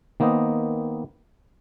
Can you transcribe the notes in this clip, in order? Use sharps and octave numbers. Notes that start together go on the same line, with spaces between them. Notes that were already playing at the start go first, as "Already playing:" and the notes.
D#3 A#3 B3 C5 D#5